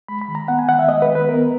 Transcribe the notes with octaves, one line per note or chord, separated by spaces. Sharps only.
G#3 B5
B5
D#3
A#5
B3 F#5
G#5
D#3 F#5
E5
G#3 D#5
B4
D#3
B4
B3 A#4